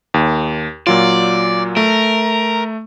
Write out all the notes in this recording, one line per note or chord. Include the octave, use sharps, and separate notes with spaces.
D#2
A#2 F#3 F4 D5
A3 A#4